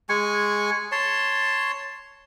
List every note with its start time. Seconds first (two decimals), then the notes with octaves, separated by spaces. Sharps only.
0.09 G#3 G#5 C#6
0.92 C#5 A5 C6